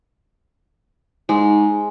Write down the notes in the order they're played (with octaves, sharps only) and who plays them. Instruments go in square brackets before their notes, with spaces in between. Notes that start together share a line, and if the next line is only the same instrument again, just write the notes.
[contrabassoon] G#2 [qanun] G#3